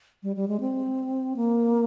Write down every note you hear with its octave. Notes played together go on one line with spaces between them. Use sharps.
G3
G3
G#3
C4
A#3